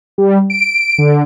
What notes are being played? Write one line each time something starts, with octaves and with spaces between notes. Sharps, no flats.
G3
D7
D3